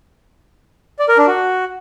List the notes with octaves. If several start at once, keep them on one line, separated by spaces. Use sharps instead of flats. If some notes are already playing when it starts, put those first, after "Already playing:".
D5
A#4
D4
F#4